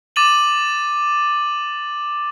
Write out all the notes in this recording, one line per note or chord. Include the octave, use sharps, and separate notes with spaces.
D6 A6 D#7 F#7